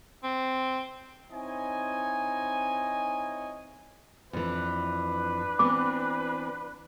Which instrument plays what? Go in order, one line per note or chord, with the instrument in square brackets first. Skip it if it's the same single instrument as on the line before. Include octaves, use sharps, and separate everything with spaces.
[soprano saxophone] C4
[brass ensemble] C4 D#4 E4 C#5 D#5 G#5
[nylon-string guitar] F2 E3 [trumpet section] D4 B4
[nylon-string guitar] E3 B3 C4 [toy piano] D6